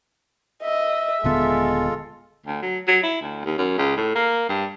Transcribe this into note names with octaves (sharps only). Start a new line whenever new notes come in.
D#5 E5
D#1 D3 G#3 B3 F4 A4
D2
F#3
F#3
E4
D2
D#2
F#2
C#2
A2
A#3
G2